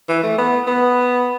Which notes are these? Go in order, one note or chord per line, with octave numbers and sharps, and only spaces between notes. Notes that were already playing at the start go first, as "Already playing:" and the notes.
E3
A3
B3
B3